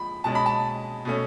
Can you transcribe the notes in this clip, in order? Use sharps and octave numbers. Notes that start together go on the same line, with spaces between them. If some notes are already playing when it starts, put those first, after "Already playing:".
Already playing: F3 G#3 B5
B2 G#3 C#4 A5
B5
A5
B2 A3 C#4